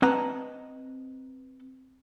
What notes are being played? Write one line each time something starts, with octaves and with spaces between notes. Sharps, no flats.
C4 B4 D#5 F#5 A5 A#5